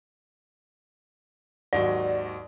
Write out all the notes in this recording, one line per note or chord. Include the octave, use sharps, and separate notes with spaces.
D#2 G#2 F#3 D5